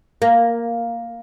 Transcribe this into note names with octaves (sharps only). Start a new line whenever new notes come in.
A#3